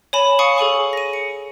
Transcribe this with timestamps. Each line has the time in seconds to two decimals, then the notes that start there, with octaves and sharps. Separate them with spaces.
0.13 C#5 G#5 B5 E7
0.39 F5 G#5 C#6 D#6 C#7
0.58 G#4 A4 G#5 C#6
0.93 A#6 D#7
1.13 C#7